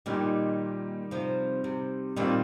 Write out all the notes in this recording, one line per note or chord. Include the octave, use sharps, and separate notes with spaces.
A#2 D#3 G3 D#4 G4
C3 F3
C3
A#2 D#3 G3 C4 F4